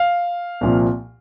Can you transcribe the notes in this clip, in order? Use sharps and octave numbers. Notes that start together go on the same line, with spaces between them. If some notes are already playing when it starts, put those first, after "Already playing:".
Already playing: F5
C2 A#2 F3